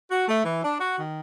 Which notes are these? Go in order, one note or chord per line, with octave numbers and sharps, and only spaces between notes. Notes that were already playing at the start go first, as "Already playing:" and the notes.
F#4
A3
E3
D4
F#4
D#3